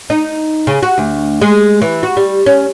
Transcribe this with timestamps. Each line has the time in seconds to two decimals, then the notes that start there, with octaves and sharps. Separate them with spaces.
0.10 D#4
0.67 C#3
0.83 F#4
0.98 D2
1.41 G#3
1.82 E3
2.03 F#4
2.17 G3
2.46 C#4